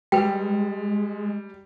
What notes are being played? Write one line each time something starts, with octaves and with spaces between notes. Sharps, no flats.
G3 G#3 B4 G5